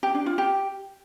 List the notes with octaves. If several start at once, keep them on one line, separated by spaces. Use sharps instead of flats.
G4
D4
F4
G4